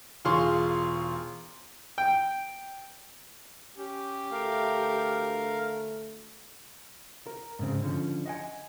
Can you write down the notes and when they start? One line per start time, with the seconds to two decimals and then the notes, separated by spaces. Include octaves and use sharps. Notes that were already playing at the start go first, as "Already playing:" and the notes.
0.25 E1 F4 G#4 C6 C#6
1.98 G5
3.77 C#4 G4
4.32 D2 A3 A#4 F5
7.27 A#4
7.59 G#2 C#3 C4
7.83 D3 F3 C#4
8.26 D#5 F#5 G#5